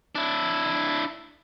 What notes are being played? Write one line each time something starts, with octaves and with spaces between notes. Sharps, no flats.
D4 E4